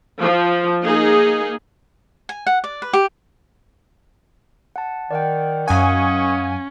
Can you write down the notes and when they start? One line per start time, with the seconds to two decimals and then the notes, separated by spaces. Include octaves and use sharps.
0.20 F3
0.84 A#3 D#4 G#4
2.29 G#5
2.47 F#5
2.64 D5
2.82 B4
2.93 G4
4.76 F#5 A5
5.11 D#3 D5 F#5 G5
5.68 F#2 D#3 C#4 F5 F#5 G#5 C#6 D#6